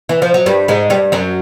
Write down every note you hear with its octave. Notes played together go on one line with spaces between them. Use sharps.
E3
F3
F#3
G2 G3
G#2 G#3
G2 G3
F#2 F#3